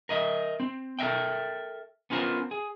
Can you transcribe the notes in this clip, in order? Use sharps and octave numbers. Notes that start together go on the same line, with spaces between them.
A#4 D#5 E5
C4
A4 A#4 D#5 E5 G5
B3 C#4 F4 F#4 A#4 C5
G#4